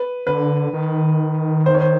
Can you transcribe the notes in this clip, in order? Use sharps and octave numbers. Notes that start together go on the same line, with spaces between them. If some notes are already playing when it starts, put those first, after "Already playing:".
Already playing: B4
D3 B4
D#3
C5
C#5
C5